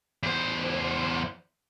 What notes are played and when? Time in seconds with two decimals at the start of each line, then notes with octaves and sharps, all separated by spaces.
0.23 E2 C5